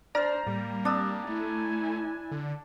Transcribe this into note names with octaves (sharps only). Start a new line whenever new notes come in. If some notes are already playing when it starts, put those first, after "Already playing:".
D4 C5 D5 A#5 F6 A6
A2 G3 A#3
C4 D4 D#6 E6
A3 E4 G#5
D3